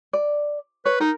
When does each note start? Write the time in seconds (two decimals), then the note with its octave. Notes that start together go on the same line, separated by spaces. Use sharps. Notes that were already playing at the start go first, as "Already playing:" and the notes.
0.13 D5
0.85 B4 C#5
1.00 D#4 A#4